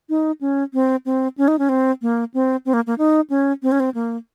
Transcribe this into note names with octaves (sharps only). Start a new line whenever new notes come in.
D#4
C#4
C4
C4
C#4
D#4
C#4
C4
A#3
C4
C4
A#3
A#3
D#4
C#4
C4
C#4
C4
A#3